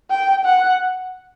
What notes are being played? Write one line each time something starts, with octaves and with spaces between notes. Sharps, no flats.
G5
F#5